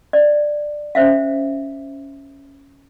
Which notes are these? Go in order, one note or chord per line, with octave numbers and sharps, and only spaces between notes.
D5
C#4 C5 E5 F5